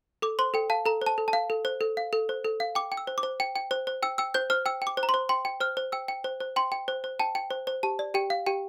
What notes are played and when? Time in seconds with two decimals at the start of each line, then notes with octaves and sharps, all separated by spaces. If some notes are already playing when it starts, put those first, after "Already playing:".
0.22 A4 D6
0.39 C5 C6
0.54 A4 G5
0.70 F5 A5
0.85 A4 A#5
1.02 C5 A5
1.18 A4
1.28 A5
1.33 F5
1.50 A4
1.65 C5
1.81 A4
1.97 F5
2.13 A4
2.29 C5
2.45 A4
2.60 F5
2.75 G5 D6
2.92 G5
2.97 E6
3.07 C5
3.18 D6
3.23 C5
3.40 G5
3.56 G5
3.71 C5
3.87 C5
4.03 G5 E6
4.18 G5 E6
4.34 C5 G6
4.50 C5 F6
4.66 G5 E6
4.82 G5
4.87 D6
4.97 C5
5.03 A#5
5.09 C6
5.14 C5
5.29 G5 C6
5.45 G5
5.60 C5 F6
5.77 C5
5.92 G5 E6
6.08 G5
6.24 C5
6.40 C5
6.56 G5 C6
6.72 G5
6.88 C5
7.04 C5
7.19 G5 A5
7.35 G5
7.51 C5
7.67 C5
7.83 G4 A5
7.99 D5
8.14 G4 G5
8.30 F5
8.47 G4 G5